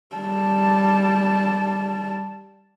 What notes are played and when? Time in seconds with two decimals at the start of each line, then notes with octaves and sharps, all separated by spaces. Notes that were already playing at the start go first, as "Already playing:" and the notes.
0.16 G3 A5